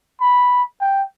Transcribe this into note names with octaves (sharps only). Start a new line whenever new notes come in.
B5
G5